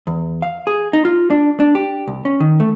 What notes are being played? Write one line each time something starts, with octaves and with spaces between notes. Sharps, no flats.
E2
F5
G#4
D#4
F4
D4
D4
G4
C2
C#4
D#3
A3